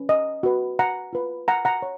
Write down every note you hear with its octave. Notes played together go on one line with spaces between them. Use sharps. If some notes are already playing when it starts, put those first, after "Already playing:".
Already playing: C#4 B4
D#5
F#4 B4
F#5 A#5
F4 B4
F#5 A#5
F#5 A#5
C#5